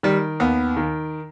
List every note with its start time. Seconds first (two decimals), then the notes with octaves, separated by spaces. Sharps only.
0.03 D#3 G3
0.40 D#2 B3
0.77 D#3